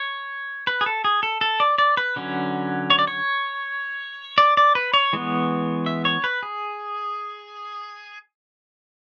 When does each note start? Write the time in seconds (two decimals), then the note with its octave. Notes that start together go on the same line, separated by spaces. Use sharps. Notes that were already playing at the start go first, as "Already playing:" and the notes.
Already playing: C#5
0.67 B4
0.81 G#4
0.86 A4
1.04 G#4
1.23 A4
1.41 A4
1.60 D5
1.78 D5
1.97 B4
2.16 D3 F#3 C#4
2.90 C#5
2.99 D5
3.07 C#5
4.38 D5
4.57 D5
4.75 B4
4.94 C#5
5.13 E3 G#3 B3
5.86 E5
6.05 C#5
6.24 B4
6.43 G#4